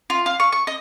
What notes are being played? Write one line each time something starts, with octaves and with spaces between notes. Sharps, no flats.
F4
F5
C#6
C#6
D#5